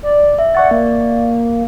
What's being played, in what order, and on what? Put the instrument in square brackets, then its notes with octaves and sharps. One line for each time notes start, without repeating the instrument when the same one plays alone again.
[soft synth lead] D5
[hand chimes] E5
[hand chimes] D5 C#6 A6 [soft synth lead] F#5
[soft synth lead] A#3